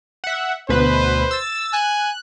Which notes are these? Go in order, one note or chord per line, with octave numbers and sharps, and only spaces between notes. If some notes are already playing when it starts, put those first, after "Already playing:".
E5 F#5
D2 B2 B4 C5
E6 A6
G#5 F#6